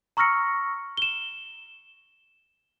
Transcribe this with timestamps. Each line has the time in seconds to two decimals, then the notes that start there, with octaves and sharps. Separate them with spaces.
0.17 A#5 C#6 E6 F6 A#6 C#7
0.97 E7 G7